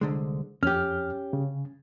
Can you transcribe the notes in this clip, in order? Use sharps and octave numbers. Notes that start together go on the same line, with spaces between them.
C2 D3 G#3
F2 C#4 G4 F6
C#3